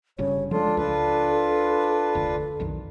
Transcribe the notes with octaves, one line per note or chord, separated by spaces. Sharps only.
G1 G2 C#3 C#5
F3 G#3 D4 F4 A4
C#2 D4 F4 B4
F1 D2
B1 F2 D#3